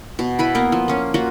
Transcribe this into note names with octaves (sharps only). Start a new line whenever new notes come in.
B2
E4 B4 B5
A#3 B3 A#4
F3
A#3 C#4
A#3 F4 F#4